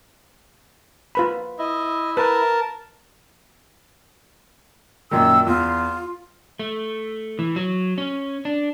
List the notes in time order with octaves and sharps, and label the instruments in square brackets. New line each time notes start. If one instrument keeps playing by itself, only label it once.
[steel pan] F4 B4 B5
[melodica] E4 [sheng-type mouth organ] D#5
[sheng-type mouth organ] A#4 A5 [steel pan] B4
[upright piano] F#2 A#2 D#3 [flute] E6
[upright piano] E2 [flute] F4
[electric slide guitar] A3
E3
F#3
C#4
D4